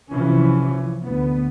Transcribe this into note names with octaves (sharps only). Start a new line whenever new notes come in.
C2 C3 E3 F3 C#4
D2 B3